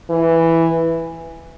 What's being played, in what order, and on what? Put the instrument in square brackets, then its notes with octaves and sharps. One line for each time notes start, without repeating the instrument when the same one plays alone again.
[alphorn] E3